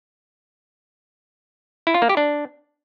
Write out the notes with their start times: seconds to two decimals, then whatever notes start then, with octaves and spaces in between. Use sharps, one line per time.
1.87 E4
1.94 F4
2.02 A#3
2.09 G4
2.17 D4